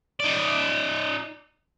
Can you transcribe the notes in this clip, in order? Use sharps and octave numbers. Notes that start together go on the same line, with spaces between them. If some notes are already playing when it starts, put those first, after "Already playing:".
D#4 D5